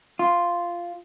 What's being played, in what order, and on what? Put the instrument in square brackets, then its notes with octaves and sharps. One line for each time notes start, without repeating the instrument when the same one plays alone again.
[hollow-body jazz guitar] F4